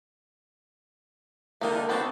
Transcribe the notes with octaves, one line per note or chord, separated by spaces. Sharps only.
D3 D#3 A3 A#3 D#4 A#4
B3 C4 F#4 G4 A4